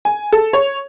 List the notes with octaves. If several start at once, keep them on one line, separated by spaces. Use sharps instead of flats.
G#5
A4
C#5